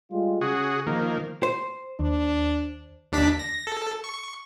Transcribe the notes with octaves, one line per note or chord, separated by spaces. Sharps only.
G3 G#3 F4
C#3 F#4 G#4
D#3 F3 A#3 A#4
C5
D#2 D4
D#2 D4 B6
A#6
A4
C#6